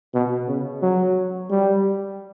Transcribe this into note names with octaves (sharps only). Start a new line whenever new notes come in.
B2
C#3
F#3
G3